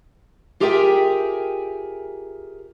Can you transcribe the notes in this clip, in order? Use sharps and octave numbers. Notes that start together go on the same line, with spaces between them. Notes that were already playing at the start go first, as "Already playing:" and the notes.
F4 G4 G#4 A#4 E5 G5